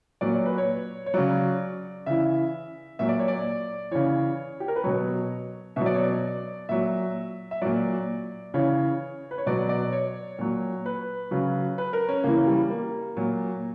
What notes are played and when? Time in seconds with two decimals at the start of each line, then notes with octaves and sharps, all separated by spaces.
0.21 A#2 F#3 D5
0.34 C#5
0.46 B4
0.58 C#5
1.06 C#5
1.14 C#3 F#3 D5
2.06 C#3 E3 E5
2.99 A#2 F#3 E5
3.09 D5
3.19 C#5
3.28 D5
3.91 C#3 E3 C#5
4.60 G4
4.68 A#4
4.76 B4
4.84 B2 F#3 C#5
5.76 B2 F#3 E5
5.86 D5
5.94 C#5
6.03 D5
6.69 A#2 F#3 E5
7.51 E5
7.62 A#2 F#3 D5
8.54 C#3 E3 C#5
9.31 B4
9.38 C#5
9.46 B2 F#3 D5
9.69 D5
9.93 C#5
10.39 A#2 F#3
10.86 B4
11.31 C#3 F#3
11.78 B4
11.93 A#4
12.09 C#4
12.24 C#3 E3 A#3
12.47 G3
12.70 A#3
13.17 A#2 F#3